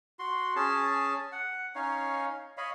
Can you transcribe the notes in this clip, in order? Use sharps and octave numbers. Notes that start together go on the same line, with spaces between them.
F#4 C6
C#4 G#4 A5
F#5
C#4 D#4 C#5 F5
C#5 D#5 F5 B5